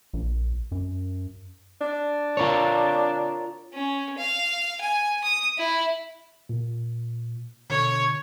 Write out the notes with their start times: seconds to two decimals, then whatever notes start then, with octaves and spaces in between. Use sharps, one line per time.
0.13 A#1
0.71 F#2
1.81 D4
2.37 F4 A#4 C#5
3.73 C#4
4.18 F5
4.81 G#5
5.24 D#6
5.58 E4
6.49 A#2
7.70 B2 D3 C#5